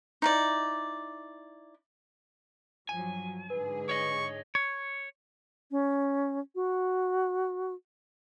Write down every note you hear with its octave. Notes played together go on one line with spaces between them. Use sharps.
D#4 E4 D5
G2 F3 F#3 G#5
G#2 D3 G#4 B4
C#5 D#5 C#6
C#5
C#4
F#4